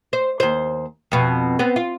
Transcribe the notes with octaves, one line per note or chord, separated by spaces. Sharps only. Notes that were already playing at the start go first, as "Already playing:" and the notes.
C5
D#2 C5
F2 B2
B3 C4
F4